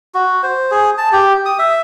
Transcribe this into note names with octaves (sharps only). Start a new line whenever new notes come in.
F#4
C5
G#4
A5
G4
D#6
E5